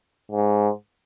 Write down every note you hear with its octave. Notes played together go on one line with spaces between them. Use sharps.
G#2